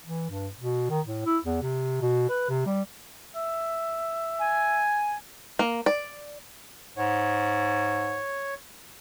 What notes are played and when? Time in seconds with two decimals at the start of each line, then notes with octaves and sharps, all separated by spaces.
0.05 E3
0.29 G2
0.56 B2
0.90 D#3
1.06 A2
1.26 E4
1.44 E2
1.62 C3
2.01 B2
2.29 B4
2.49 C3
2.66 G3
3.36 E5
4.40 G#5
5.59 A#3
5.86 D5
6.97 G#2 C#5